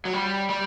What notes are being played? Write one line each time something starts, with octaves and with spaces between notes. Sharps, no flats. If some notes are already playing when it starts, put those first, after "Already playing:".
F#3
G3
G3